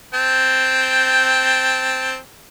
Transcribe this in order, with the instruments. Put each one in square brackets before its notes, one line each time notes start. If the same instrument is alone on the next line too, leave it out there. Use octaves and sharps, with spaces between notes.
[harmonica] C4 G5 A5